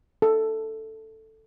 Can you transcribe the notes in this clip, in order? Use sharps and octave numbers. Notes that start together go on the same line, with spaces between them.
A4